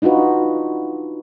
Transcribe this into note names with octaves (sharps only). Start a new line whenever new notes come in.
D4 D#4 F4 F#4 B4